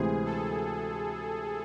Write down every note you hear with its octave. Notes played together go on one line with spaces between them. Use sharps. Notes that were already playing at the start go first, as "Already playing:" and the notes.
Already playing: D2 C3 E3 G#3 C4 G#4
A4